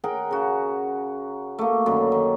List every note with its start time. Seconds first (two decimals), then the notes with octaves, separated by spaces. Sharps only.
0.04 G#4 A#4 F#5 G5
0.31 C#3 F#4
1.59 A3 A#3
1.86 F#2 D3 D#3
2.12 D#3